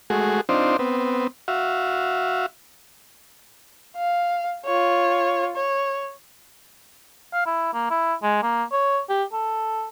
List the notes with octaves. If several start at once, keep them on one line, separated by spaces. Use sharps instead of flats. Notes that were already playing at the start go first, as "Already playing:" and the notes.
G#3 A3 F#4 G#4
C4 D4 D#4 F4 C5
B3 C4
F#4 E5 F5
F5
F4 C#5
C#5
F5
E4
A#3
E4
G#3
A#3
C#5
G4
A4